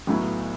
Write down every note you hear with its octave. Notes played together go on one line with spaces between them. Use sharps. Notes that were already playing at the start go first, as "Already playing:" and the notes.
B1 A2 F#3 B3 E4